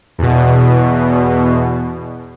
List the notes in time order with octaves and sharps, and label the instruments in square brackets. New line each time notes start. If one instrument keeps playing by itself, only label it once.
[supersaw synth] E2 B2